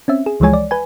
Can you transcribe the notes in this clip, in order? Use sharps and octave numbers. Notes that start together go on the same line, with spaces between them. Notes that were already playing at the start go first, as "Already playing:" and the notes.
C4 C#4 E5
G#4
C#2 E3 F3 G#3 C#5 G#5
D5
B4 G#5